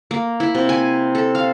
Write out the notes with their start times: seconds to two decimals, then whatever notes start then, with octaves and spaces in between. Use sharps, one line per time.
0.11 A#3
0.40 E4
0.55 C3
0.69 G#5
1.15 A4
1.35 F5